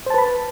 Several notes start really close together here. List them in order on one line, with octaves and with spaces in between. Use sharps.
C5 A5 B4 B5